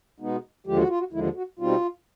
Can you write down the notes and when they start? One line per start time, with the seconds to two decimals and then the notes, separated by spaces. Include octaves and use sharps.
0.20 B2 G#3 B3 D#4
0.67 D#2 D3 F3 G#3 G4
0.77 F#4
0.88 F4
0.99 F#4
1.13 D#2 D3 F3 G#3 E4
1.36 F#4
1.59 B2 G3 C4 D#4 F4